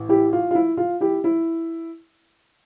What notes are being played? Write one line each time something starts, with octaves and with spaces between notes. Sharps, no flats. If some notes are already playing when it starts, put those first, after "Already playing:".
Already playing: A1
E4 G4
F4
F4
E4
F4
E4 G4
E4